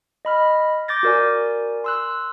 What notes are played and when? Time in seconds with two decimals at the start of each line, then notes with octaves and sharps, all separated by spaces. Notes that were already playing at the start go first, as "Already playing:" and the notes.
0.25 D#5 B5 F6
0.88 D6 G6 A6 A#6
1.03 F#4 A#4 D5 G#5
1.84 C6 E6 F#6